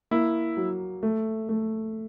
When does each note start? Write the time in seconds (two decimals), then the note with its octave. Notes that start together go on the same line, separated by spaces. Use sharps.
0.11 A#3 E4
0.57 F#3
1.03 A3
1.49 A3